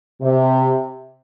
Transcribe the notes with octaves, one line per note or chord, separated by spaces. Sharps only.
C3